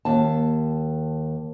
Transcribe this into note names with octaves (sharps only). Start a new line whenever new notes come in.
D#2 A5